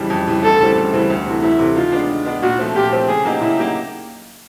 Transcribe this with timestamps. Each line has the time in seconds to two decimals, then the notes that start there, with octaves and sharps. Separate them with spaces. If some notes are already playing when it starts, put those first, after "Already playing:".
Already playing: F2 C#3 E3 G3
0.10 F2
0.27 C#3 E3 G3
0.43 D2 A4
0.60 C#3 E3 G3 C4
0.76 D2
0.93 C#3 E3 G3 C4
1.10 D2
1.26 C3 E3 A3
1.42 D2 E4
1.59 C3 E3 A3
1.76 D#3 F4
1.92 G#3 B3 D4
2.10 D#3
2.25 G#3 B3 D4
2.42 A#2 F#4
2.59 F3 A3 C4
2.76 A#2 G4
2.92 F3 A3 C4
3.08 C#3 G#4
3.25 F#3 A#3 D#4 G4
3.41 C#3 E4
3.58 F#3 A#3 D#4 G4